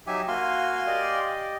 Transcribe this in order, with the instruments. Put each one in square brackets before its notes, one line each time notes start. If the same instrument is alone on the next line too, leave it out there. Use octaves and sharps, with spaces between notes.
[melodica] F#3 G4 [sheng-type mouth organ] D#4 E5 G#5
[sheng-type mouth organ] A#3 F#4 [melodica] F5 G#5 C6
[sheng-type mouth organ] G4 D5 D#5